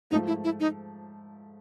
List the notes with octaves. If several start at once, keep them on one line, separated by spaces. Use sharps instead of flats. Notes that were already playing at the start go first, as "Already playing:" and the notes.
G#2 F3 A3 D#4
E4
E4
D#4